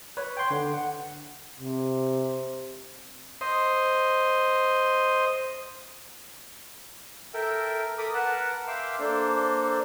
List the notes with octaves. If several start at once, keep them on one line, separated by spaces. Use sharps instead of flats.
B4 C#5
G5 C6
D3
F#5
C3
C5 D#5
A4 A#4 E5 G5
A4 A#4 B5 D6 D#6
A#4 B4 F#5 A5
E5 F5 G5 C6 D6 E6
A#3 D4 A4 C5